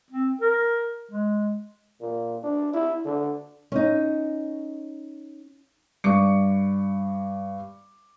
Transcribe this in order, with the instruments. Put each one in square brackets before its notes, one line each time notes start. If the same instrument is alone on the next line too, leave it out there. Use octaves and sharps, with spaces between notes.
[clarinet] C4
A#4
G#3
[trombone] A#2
D4
E4
D3
[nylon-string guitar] C#4 D#4
[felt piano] G2 D5 C#6 D6 C#7